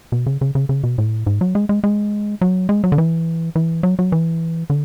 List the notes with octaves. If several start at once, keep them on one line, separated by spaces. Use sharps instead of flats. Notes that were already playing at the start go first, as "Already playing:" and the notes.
B2
C#3
C#3
C#3
C#3
B2
A2
G#2
F#3
G#3
G#3
G#3
F#3
G#3
F#3
D3
E3
E3
F#3
F#3
E3
D3